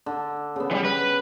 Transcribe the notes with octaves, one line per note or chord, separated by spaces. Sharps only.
D3
C#3 B3
E3 G3
B4